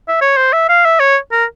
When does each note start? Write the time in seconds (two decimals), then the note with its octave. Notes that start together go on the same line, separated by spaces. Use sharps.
0.08 E5
0.21 C#5
0.37 C5
0.53 E5
0.69 F5
0.85 E5
1.00 C#5
1.32 A#4